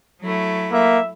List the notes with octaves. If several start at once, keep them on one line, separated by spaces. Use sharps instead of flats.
F#3 A3 E4
A#3 E5